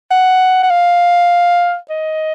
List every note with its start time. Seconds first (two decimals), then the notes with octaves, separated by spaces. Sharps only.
0.11 F#5
0.63 F#5
0.70 F5
1.89 D#5